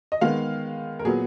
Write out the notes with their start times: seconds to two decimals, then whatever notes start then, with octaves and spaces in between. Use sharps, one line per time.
0.12 D#5
0.21 D#3 G#3 B3 F5
0.99 A#4
1.05 A#2 F#3 B3 G#4